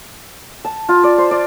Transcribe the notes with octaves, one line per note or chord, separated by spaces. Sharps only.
A5
F4
D5
C5
D5